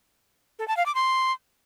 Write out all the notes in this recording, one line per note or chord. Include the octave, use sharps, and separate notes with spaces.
A4
A5
F5
D6
C6